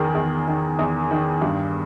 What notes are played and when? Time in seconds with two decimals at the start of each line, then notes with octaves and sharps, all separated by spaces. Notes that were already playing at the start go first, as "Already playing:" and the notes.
Already playing: E2 D#3 G#4 A#4
0.15 E2
0.47 D#3
0.79 E2
1.11 D#3
1.42 G2